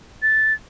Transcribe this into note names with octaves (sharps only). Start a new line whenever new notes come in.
A6